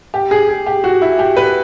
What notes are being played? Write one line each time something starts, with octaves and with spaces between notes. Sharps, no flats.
G4
G#4
G#4
G4
F#4
E4
G4
B4